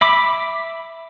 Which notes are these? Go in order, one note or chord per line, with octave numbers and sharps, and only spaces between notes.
E5 B5 D6